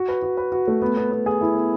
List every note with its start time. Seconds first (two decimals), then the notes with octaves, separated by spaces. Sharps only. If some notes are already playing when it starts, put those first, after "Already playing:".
Already playing: F#4
0.08 B4
0.22 F#4
0.37 B4
0.52 F#4
0.67 A3
0.82 B3
0.97 B3
1.11 B3
1.26 G#4
1.41 E4
1.55 B3